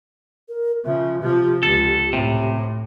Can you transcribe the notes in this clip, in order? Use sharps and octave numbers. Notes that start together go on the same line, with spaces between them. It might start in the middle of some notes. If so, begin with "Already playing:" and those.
A#4
C#3 F3 E5
C3 F3 G4
C#2 A4
A2 C3